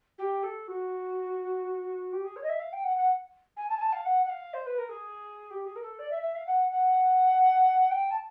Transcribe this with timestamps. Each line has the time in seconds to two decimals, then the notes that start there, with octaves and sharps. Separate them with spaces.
0.18 G4
0.43 A4
0.67 F#4
2.12 G4
2.24 G#4
2.36 C#5
2.43 D#5
2.48 E5
2.59 F5
2.72 G5
2.83 F#5
2.97 F#5
3.56 G#5
3.69 A5
3.76 G#5
3.81 A5
3.92 F5
4.05 F#5
4.25 F#5
4.29 F5
4.53 C5
4.66 B4
4.78 A#4
4.89 G#4
5.50 G4
5.65 G#4
5.75 A#4
5.82 A4
5.98 D5
6.10 E5
6.21 E5
6.35 F5
6.46 F#5
6.71 F#5
7.90 G5
8.10 A5